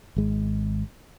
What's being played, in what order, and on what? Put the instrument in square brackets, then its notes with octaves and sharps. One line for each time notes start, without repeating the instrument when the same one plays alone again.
[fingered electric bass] G#1 G#3